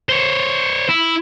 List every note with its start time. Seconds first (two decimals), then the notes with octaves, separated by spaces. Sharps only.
0.09 C5 C#5
0.89 E4